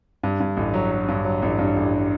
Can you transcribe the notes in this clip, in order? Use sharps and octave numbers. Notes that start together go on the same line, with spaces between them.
G2
G2
A1
F#3
F#3
G2
F#3
A1
G2
A1